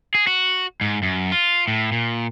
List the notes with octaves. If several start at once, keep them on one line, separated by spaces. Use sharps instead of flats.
G#4
F#4
G#2
F#2
F4
A2
A#2